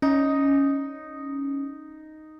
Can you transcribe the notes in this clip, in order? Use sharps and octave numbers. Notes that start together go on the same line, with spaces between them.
C#4 D#4